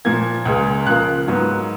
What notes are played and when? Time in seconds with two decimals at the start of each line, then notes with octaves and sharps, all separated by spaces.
0.05 A#2 F3 A#3 G#6
0.46 C#2 C#3 G#3
0.87 C#3 F3 A#3 F#6
1.28 G#2 F#3 B3